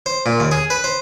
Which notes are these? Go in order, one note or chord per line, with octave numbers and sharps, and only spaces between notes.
C5
A#2
D#2
G#4
B4
C5